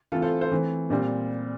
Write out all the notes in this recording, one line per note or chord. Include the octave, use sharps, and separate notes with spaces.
E3 A3 C4 F4 A4
A4 C5
A4 C5
E3 A3 C4
A#2 G3 C4